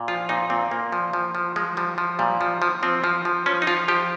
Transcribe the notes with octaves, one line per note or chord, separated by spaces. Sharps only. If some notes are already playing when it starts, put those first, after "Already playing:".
Already playing: A#2
F3 F4
A#2 D#4
A#2 C4
A#2 A#3
F3
F3
F3
F3 G#3
F3 G3
F3
A#2 G3
F3
F3
F3 C4
F3
F3
F3 C#4
D#4
F3 F4
F3 G4